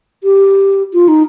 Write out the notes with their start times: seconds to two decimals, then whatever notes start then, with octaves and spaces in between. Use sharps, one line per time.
0.24 G4
0.94 F4
1.08 D#4